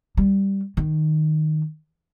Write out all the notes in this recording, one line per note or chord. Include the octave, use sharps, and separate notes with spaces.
G3
D#3